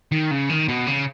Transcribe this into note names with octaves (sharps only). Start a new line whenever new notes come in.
D#3
C#3
D#3
B2
C#3